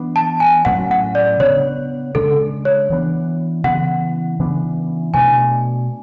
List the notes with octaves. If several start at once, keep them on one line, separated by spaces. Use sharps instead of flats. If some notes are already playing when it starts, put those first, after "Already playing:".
Already playing: E3 B3 D4
A5
G#5
A2 F#3 A3 C#4 F#5
F#5
D5
C#3 G#3 B3 D4 C#5
C#3 G#3 D4 A4
C#5
E3 B3 D4
C#3 E3 B3 F#5
C#3 E3 B3 D4
B2 A3 D4 G#5